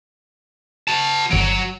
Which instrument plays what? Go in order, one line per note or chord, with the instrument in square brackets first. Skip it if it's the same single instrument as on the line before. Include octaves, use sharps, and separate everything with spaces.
[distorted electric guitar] F#4 A5
[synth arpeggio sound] G1 D7 [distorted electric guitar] F#3